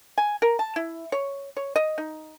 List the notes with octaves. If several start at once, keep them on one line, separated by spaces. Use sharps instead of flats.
G#5
A#4
A5
E4
C#5
C#5
D#5
D#4